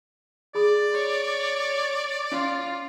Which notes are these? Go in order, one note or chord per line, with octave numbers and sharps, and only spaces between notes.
G#4 D5 B5 D#6
C#5
C#4 F4